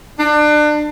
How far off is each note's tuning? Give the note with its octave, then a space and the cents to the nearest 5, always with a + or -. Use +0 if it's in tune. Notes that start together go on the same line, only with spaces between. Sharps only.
D4 +30